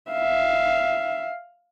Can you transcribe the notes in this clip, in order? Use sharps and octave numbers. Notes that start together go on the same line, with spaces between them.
E5 F5